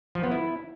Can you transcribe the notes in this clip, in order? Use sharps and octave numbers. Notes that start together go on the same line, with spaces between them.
F3
B3
E4